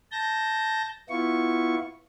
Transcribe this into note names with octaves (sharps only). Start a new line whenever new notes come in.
A5 G6 A#6
B3 E4 F4 C#6